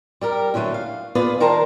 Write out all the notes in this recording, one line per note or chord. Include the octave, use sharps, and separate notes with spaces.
G3 G4 A#4
E2 D3 F#3 A3 C#4
F5
B3 F4 G#4 B4 D5
D#3 G3 A#4 C5 A5 A#5